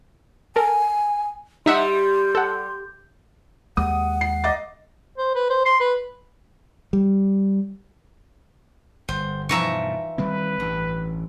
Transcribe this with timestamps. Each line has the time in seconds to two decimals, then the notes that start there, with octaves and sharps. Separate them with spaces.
0.56 A4 A#4 G#5
1.66 G3 D#4 E5 F#5 C6
2.35 A4 F#5
3.77 D#2 G#3 F#5 D#6
4.21 C7
4.44 D#5 D6 A6
5.18 C5
5.35 B4
5.50 C5
5.66 C6
5.80 B4
6.93 G3
9.09 G1 C5
9.49 G2 B2 E3 F3 D#4 E5 A#5 C#6
10.18 D#3 G3 C4 B4
10.60 A1 G2 E3